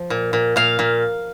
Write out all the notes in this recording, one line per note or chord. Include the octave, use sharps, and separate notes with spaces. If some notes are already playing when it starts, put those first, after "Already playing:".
Already playing: F3
A#2
A#2
A#2 F5
A#2